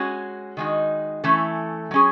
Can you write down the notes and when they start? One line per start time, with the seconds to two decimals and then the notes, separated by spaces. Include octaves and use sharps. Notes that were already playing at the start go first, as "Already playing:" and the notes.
Already playing: G#3 C#4 F#4
0.57 D#3 G#3 D#4 F#4
1.24 E3 A3 C#4 E4 A4
1.91 F#3 C#4 G#4